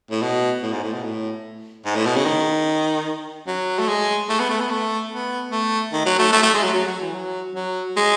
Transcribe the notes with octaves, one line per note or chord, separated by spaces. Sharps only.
A2
B2
A2
G#2
A2
B2
A2
G#2
A2
B2
C#3
D#3
F#3
A3
G#3
A3
B3
A3
B3
A3
B3
A3
D#3
F#3
A3
A3
A3
G#3
F#3
F#3
F#3
E3
F#3
F#3
G#3